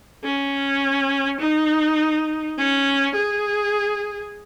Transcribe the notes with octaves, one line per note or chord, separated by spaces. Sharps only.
C#4
D#4
C#4
G#4